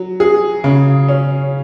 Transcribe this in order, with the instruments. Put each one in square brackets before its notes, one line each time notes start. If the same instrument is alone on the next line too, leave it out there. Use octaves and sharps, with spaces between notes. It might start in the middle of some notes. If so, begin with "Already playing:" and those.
Already playing: [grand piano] F#3
G#4
C#3
C#4